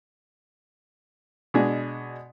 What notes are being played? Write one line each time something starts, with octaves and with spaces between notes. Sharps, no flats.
B2 G#3 D4 G#4